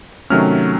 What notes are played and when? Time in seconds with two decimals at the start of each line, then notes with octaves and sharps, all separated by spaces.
0.30 C3 D#3 F#3 A3 C#4 F6